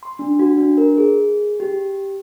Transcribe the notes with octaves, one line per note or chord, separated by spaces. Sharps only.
C6
D4
F#4
D4
A#4
G#4
G4